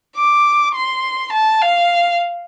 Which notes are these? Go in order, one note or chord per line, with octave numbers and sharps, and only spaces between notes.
D6
C6
A5
F5